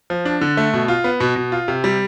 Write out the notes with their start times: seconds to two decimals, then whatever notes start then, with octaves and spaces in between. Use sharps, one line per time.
0.10 F3
0.25 D4
0.41 D3
0.57 A3
0.73 B2
0.88 F4
1.04 B3
1.20 B2
1.36 B2
1.52 F4
1.68 C3
1.84 G3